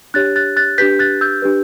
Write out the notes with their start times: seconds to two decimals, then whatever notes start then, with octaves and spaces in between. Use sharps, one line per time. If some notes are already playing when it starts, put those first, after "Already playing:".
0.14 D4 G4 C#5 F#6 A6
0.36 F#6 A6
0.57 F#6 A6
0.78 D4 G4 B4 G6 B6
0.99 F#6 A6
1.21 E6 G6
1.42 D4 G4 B4